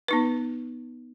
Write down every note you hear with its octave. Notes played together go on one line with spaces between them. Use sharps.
B3 D#4 B4